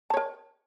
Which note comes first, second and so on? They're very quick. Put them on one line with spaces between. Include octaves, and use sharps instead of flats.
A5 C#5 A#4